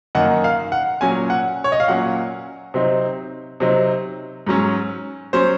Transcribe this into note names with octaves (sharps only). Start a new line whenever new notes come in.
F#2 D#3 A#3 D#4 F#5
F5
F#5
A#2 F#3 C#4 G#5
F#5
C#5
D#5
F5
A#2 F#3 C#4 F#5
C3 F#3 C4 D#4
C3 F#3 C4 D#4
G#2 F#3 C#4
F#3 C#4 C5